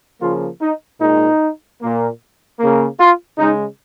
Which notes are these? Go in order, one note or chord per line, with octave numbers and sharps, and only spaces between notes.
C#3 F3 A#3 F4
D#4
A#2 G#3 D#4
A#2 A#3
C#3 A#3
F4
C#3 G#3 D#4